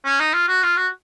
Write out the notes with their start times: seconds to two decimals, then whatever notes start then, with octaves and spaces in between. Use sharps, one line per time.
0.05 C#4
0.20 D#4
0.34 F4
0.48 F#4
0.63 F4
0.77 F#4